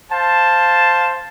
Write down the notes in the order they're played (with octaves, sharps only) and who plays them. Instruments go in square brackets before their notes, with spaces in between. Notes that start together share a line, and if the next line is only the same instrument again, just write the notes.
[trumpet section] C5 F5 A5